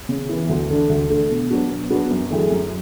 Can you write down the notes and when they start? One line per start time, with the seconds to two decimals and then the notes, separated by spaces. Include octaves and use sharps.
0.09 C#3
0.29 E3 B3
0.49 D2
0.70 D3 A3 D4
0.89 D2
1.10 D3 A3 D4
1.30 B2
1.50 F#3 B3 D4 F#4
1.70 B2
1.90 F#3 B3 D4 F#4
2.11 F#2
2.30 D3 A3 E4 G#4
2.50 F#2